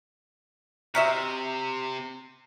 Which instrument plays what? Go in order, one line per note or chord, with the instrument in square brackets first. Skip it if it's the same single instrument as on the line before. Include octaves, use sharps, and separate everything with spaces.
[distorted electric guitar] C3 [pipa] F#4 D#5 E5 [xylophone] A#5 F6 B6